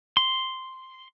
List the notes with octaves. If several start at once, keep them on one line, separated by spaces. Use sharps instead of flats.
C6